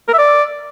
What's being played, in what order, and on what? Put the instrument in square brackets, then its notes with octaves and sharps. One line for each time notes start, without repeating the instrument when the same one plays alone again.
[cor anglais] A#4
E5
D5